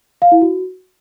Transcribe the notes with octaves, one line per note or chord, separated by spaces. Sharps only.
F5
E4
F#4